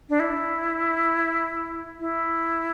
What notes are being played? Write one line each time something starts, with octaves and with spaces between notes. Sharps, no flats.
D4
E4
E4